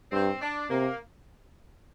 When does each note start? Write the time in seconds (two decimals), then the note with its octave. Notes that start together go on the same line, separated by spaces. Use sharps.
0.12 G2 C4
0.40 D4
0.70 C3 A#3